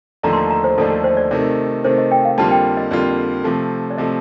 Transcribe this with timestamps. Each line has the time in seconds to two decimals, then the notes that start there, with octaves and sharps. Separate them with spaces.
0.23 D#2 D3 F3 A3 D4 A#5
0.33 C6
0.37 A#5
0.50 A#5
0.64 C5
0.78 D#2 D3 F3 A3 D4 A4
0.90 A4
1.04 C5
1.17 D5
1.31 C3 D#3 A3 D5
1.84 C3 D#3 A3 C5
1.98 D#5
2.11 G5
2.25 F5
2.38 F2 D3 G3 A#3 F4 A5
2.51 G5
2.77 D#5
2.91 F2 D3 G3 A#3 F4 D5
3.44 C3 F3 A3
3.91 D5
3.98 C3 F3 A3 D#5